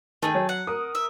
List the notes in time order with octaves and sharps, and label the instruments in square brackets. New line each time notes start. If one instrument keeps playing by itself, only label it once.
[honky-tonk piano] D#3 [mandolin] A3 G#4 G5
[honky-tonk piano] F#3
[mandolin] F#5
[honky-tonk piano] A#4 D#6
[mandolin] E5